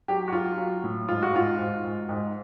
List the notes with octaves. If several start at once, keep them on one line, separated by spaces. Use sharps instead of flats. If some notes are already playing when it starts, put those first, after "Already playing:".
F#3 G4
F#4
F#3 F4
F#3
A2
G#2 F4
F#4
G#2 F4
G#2
G#2
G#2